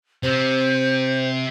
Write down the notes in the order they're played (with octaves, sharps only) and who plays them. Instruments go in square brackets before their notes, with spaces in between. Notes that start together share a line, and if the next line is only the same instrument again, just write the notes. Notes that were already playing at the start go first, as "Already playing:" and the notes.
[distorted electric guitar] C3 [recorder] C5